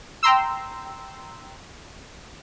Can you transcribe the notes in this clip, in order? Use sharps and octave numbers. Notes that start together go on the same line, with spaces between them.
G5 A#5 C6 E6